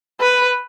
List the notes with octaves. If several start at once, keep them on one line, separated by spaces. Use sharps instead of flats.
B4